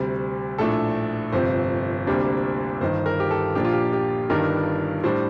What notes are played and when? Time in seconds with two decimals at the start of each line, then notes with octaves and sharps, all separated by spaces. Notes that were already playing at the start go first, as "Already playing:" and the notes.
Already playing: D2 C3 G3
0.58 A#1 A2 A3 D4 A4
1.32 G1 F2 C3 C5
2.07 D2 C3 G3 A#3 D4
2.81 G1 G2 D#3 C5
3.06 A#4
3.20 G4
3.31 A4
3.55 A#1 A#2 F3 A#3 D4 G4
3.65 F4
3.73 G4
3.93 G4
4.29 G1 G2 D#3 G3 D4 A#4
5.04 A2 G3 D4 C5